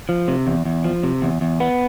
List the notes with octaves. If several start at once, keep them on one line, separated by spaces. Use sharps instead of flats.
F3
C3
E2
E2
F3
C3
E2
E2
B3